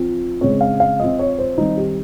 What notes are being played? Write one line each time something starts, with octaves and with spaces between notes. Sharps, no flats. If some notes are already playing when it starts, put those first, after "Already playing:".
Already playing: F3 C4
C#3 G#3 C4 C#5
F5
F5
F3 C4 D#5
C#5
C5
D#3 G3 C4 D#4
G4